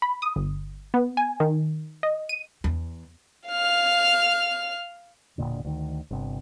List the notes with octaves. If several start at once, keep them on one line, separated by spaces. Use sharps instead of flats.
B5
D#6
G1
B3
G#5
D#3
D#5
D#7
E2
F5 F6
E1 A#1 A#2 D3
D2 D#3
G1 C3